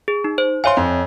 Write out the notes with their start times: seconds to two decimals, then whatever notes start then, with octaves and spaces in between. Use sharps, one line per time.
0.08 G#4
0.24 D#4
0.38 C5
0.64 C#5 E5 F5 G#5 C6
0.77 F2